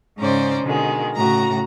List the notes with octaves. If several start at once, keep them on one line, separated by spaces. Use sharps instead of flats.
G#2 C#3 C#4 C5 D5 A#5
B2 D3 D#3 G#3
A2 C#3 F#4 A#5 A#6